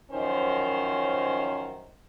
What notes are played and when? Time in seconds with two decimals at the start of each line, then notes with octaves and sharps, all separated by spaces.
0.12 F#2 D#3 F3 C#4 D#4 C5